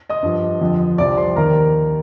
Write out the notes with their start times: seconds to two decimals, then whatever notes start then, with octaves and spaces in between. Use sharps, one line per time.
0.09 D#5 D#6
0.23 G2 F3
0.60 F2 D3 F3
0.98 C2 C3 F3 D5 D6
1.18 C5 C6
1.36 D#2 D#3 A#4 A#5